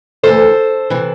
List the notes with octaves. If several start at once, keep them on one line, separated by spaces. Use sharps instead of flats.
D2 C3 E3 A4 C5
C3 E3